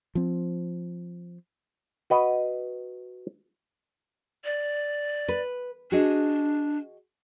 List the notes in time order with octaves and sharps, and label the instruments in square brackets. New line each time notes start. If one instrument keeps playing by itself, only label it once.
[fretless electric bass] F3 C4
[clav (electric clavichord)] F#4 B4 D#5
[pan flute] D5
[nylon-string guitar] B4
[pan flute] D4 [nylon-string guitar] F#4 G#4 D#5